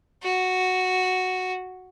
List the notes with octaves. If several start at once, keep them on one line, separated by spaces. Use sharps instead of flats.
F#4